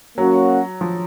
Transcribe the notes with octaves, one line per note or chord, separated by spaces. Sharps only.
F#3 A#3 C#4 F#4
F3